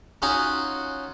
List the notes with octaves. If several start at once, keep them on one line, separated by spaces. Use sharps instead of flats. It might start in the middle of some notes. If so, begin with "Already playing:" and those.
C#4 D#4 F4 F#4